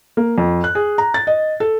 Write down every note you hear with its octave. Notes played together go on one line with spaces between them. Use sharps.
A#3
F2
F#6
G#4
A#5
A6
D#5
A4